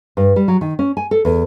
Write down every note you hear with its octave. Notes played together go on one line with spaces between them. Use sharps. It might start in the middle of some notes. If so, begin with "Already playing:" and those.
G2
G3
F#3
D#3
C#4
G#5
A4
E2